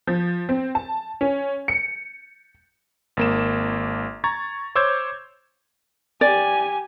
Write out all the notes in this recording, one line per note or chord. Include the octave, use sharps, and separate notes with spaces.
F3
C4
A5
C#4
C#7
G#1 A#3 E7
A#5 C#6 G#6 A6
C5 C#5 D6 E6 G6 G#6
G4 D5 G#5